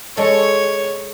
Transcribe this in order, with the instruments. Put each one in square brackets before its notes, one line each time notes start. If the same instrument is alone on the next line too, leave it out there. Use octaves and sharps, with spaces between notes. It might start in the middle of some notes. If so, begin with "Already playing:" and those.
[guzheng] G#3 A4 [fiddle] C#5